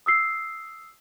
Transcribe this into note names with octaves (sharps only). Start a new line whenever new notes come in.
D#6 E6 C7